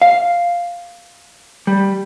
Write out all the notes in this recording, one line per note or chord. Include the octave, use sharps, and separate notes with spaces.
F5
G3